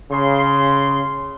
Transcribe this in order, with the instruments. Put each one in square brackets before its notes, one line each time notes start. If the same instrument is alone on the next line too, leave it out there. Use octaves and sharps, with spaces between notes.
[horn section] C#3 C6